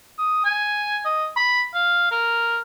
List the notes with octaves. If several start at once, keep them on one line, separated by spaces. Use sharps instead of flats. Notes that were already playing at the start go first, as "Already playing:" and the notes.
D#6
G#5
D#5
B5
F5
A#4